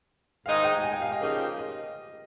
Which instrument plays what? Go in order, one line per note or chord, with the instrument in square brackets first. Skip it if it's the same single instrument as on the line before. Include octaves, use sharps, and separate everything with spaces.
[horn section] G#2 D#3 G#3 D#4 [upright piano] F5
[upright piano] G5
G#5
G5
F5
D#5
[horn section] C#3 F3 A#3 D#4 G4
[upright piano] D#5